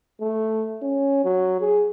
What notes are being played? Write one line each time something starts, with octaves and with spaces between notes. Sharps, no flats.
A3
C#4
F#3
G#4